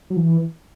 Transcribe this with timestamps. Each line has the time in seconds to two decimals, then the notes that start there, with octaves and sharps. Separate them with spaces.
0.10 F#3
0.17 E3